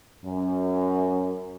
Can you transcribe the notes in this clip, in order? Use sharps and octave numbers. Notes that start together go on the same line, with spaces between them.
F#2